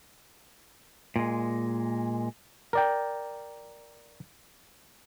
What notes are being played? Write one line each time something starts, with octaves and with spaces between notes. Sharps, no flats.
A#2 G#3
A#4 D5 G5